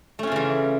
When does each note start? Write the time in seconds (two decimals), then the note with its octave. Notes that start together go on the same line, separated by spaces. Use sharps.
0.19 A3
0.23 C#4
0.27 F4
0.32 C#3
0.36 E3